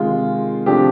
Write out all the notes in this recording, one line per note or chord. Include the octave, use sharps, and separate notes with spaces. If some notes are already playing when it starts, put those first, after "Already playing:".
Already playing: C3 D#3 G#3 F4
C3 F3 A3 D4 G4